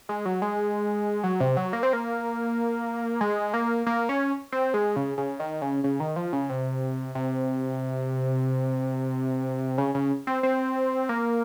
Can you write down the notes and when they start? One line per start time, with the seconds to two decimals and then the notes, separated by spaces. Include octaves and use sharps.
0.09 G#3
0.25 F#3
0.42 G#3
1.24 F#3
1.40 C3
1.57 F#3
1.73 A#3
1.83 C4
1.93 A#3
3.21 G#3
3.54 A#3
3.86 A#3
4.09 C#4
4.52 C4
4.74 G#3
4.96 C#3
5.18 C#3
5.40 D#3
5.62 C#3
5.84 C#3
6.00 D#3
6.16 F3
6.33 C#3
6.50 C3
7.15 C3
9.78 C#3
9.94 C#3
10.27 C4
10.43 C4
11.09 A#3